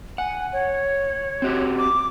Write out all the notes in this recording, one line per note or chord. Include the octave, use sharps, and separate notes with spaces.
F#5 G#5
C#5
C4 F#4 G4
D6